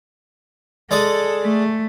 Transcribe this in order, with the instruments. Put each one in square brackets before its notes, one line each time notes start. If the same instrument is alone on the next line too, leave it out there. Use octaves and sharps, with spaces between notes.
[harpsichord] G#3 D5 D#6 [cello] A4
[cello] A3